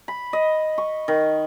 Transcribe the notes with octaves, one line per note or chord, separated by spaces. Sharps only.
B5
D#5
C#6
D#3